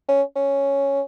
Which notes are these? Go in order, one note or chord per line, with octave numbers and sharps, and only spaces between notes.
C#4
C#4